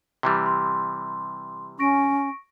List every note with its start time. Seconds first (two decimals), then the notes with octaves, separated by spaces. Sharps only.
0.23 C3 E3 G3
0.46 C6
1.79 C#4 C#6 A#6 D7